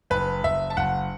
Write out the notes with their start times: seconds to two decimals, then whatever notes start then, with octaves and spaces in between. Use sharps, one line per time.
0.10 F#1 B4
0.44 F#1 E5
0.70 A5
0.77 F#1 F#5